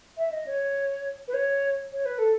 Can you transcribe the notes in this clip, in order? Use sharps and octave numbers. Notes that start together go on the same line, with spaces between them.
E5
D#5
C#5
B4
C#5
C#5
B4
A4